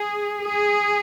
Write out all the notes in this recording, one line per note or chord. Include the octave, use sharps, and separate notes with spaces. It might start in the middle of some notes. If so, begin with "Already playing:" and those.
Already playing: G#4
G#4